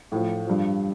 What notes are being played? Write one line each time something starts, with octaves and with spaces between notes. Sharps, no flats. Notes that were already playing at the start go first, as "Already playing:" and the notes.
A2 F3
G2 F3